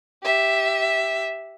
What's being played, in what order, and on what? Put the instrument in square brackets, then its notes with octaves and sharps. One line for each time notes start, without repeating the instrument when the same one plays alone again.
[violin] G4 E5